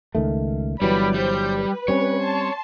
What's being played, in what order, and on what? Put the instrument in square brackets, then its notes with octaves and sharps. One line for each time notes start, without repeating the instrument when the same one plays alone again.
[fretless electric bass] C#2 D#3 A3
[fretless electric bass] G1 E3 F#3 [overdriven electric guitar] G3 [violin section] B4 D5 B5
[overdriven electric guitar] G3 [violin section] C5 G6
[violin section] B4
[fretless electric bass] G3 C4 C#4 [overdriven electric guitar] C#5
[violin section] A5 C6